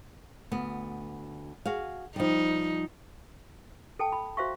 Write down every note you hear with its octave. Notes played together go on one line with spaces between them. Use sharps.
D2 B3
F#4 G#4 F5
F3 G3 D#4
A4 G5 A5
B5
F#4 C5 E5 F5 C#6